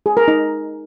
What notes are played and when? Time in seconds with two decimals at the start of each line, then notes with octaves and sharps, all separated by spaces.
0.06 G#4
0.17 A#4
0.28 D#4